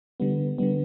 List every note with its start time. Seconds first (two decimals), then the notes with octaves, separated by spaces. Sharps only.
0.20 D3 G3 B3
0.58 D3 G3 B3